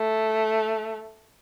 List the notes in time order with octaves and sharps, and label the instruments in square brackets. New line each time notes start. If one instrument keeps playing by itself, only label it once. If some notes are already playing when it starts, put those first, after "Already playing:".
Already playing: [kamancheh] A3